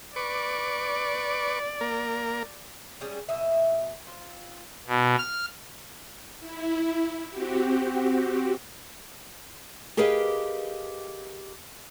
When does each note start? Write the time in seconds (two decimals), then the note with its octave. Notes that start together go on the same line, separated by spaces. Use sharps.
0.16 B4 D5 C#6 D6
1.81 A#3 A#4
3.01 G3 C#4 G#4
3.29 B2 D#5 E5
4.07 C4 F4
4.87 B2
5.18 F6
6.40 E4
7.30 C4 F#4 G4
9.97 G4 G#4 A#4 B4 D#5 F5